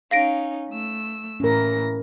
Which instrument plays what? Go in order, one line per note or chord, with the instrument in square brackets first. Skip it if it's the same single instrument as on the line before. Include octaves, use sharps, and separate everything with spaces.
[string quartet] C#4 D#4 [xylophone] F5 A#6 D7
[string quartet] A3 E6
[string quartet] A2 E3 A#6 [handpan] C#4 A#4